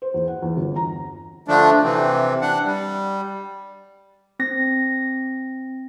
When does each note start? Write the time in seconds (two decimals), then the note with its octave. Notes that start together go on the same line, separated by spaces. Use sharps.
0.02 C5
0.14 E2
0.28 F#5
0.42 E2
0.57 G1
0.76 A#5
1.48 D3 F3 A3 D4
1.83 C3 E3 C4
2.41 D4 F#5
2.65 G3
4.39 C4 A#6